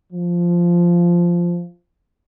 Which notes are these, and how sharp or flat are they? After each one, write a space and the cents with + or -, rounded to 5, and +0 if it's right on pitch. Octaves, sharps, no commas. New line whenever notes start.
F3 -10